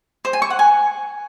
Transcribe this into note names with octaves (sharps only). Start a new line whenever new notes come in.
C5
G#5
C#6
F#5
G#5